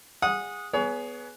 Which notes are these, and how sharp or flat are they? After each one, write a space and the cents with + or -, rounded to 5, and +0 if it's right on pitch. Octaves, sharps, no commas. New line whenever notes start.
G#4 -25 F#5 -25 D#6 +0
B3 +0 G#4 +20 C#5 +35